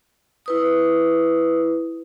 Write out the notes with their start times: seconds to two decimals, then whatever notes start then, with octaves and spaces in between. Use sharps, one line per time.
0.46 E4 B4 D#6